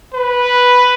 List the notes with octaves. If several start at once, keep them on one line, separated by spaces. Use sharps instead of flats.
B4